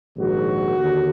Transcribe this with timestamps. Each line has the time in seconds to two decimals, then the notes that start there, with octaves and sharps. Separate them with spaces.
0.17 A#1 G#2 D#3 F#4
0.77 D#2 D3